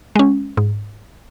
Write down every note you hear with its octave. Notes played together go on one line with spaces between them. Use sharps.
G#3 C#4
G#2